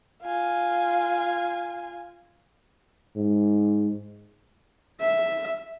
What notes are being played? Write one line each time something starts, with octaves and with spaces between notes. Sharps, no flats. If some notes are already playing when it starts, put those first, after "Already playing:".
F4 G#5
G#2
E5